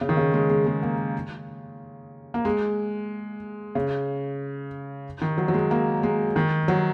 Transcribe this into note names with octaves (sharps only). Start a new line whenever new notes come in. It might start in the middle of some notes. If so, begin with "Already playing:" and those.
C#3
D#3
C#3
G#3
G#3
G#3
A#3
A#3
G#3
C#3
D#3
F#3
F#3
G#3
A#3
G#3
D#3
F#3